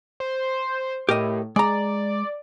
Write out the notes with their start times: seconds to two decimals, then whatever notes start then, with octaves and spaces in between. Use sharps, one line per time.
0.20 C5
1.09 A2 G4 A#4 D#5
1.56 G#3 D5 A#5